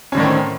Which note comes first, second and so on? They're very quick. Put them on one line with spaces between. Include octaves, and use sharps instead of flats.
C#4 D3 A2 D#3 C4